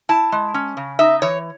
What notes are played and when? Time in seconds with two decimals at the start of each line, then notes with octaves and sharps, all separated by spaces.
0.09 E4 A5
0.32 G#3
0.54 C#4
0.77 C#3
0.99 D#4 E5
1.22 E3 C#5